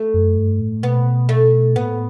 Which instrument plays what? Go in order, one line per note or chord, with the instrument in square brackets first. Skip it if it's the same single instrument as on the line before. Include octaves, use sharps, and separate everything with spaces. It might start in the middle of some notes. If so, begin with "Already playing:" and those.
Already playing: [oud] A3
[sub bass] F#2
G2
A2
[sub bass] B2 [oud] B3
[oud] A3
[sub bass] A2 [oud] B3